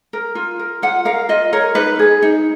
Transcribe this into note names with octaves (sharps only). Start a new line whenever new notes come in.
A#4
F4
A#4
F4 F#5
A#4 F5
F4 D#5
A#4 C#5
D#4 B4
G#4 B4
D#4